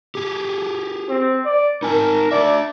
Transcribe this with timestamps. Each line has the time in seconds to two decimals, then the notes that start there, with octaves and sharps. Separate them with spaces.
0.15 G4 G#4
1.09 C4
1.45 D5
1.83 D#4 A#4 G#5 A5
2.31 D4 D5 E5